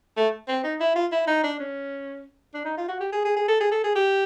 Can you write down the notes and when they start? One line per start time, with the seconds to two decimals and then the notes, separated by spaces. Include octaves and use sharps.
0.17 A3
0.48 C4
0.64 D#4
0.80 E4
0.96 F4
1.12 E4
1.27 D#4
1.44 D4
1.59 C#4
2.54 D4
2.65 D#4
2.77 F4
2.89 F#4
3.01 G4
3.12 G#4
3.25 G#4
3.37 G#4
3.48 A4
3.61 G#4
3.71 A4
3.84 G#4
3.95 G4